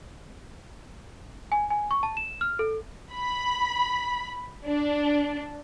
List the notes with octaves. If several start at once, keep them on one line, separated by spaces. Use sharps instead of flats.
G#5
G#5
C#6
A5
E7
F6
A4
B5
D4